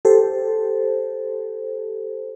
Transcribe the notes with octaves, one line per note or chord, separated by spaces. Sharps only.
G4 A4 C5